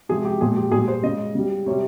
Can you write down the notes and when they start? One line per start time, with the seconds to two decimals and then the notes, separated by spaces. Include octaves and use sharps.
0.09 C3 F3 G#3 G#4
0.25 G4
0.41 A#2 F3 G#3 G#4
0.57 G4
0.72 A#2 G3 G#4
0.88 C5
1.03 C#3 G#3 D#5
1.35 C#3 G3
1.66 C3 C#5
1.70 G3